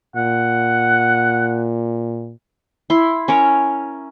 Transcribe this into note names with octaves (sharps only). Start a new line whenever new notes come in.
A#2 F#5
E4 C6
C#4 A#4 C#5